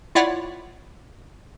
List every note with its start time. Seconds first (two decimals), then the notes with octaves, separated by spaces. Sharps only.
0.15 E4 F4 C#5 D5 F#5